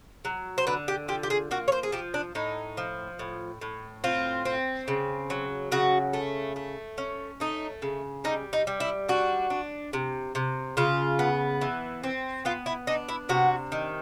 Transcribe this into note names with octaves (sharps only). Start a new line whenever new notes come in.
F#3
C5
D3 B4
G4
F3 G4
G4
G#4
A#3 F#4
C#5
C5
G#4
F3 G4
D4
A2 D#4
F3
A2
A2
C4 F4
C4
C#3
F#3
C#3 F#4
A3
A3
C#4
A3 D#4
C#3
G3 D#4
D#4
G3
E4
D4 F#4
D4
C3
C3
C#3 F4
B3
E3
C4
B3 F4
E4
D4 D#4
E4
C3 F#4
D#3